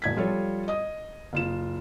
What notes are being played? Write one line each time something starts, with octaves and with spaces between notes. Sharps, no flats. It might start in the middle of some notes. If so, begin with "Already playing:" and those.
E1 G#6 B6
F3 G3 F4 A4 C#5
D#5 D#6
F#1 F4 E7